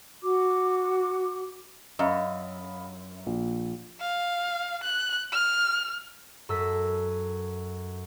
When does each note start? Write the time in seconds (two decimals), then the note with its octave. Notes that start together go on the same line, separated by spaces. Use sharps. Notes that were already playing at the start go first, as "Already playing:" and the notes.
0.23 F#4 D6
1.99 F#2 D#5 F5 B5
3.26 A#1
4.00 F5
4.84 F#6
5.32 F6
6.49 F#2 A4 E6 A#6 B6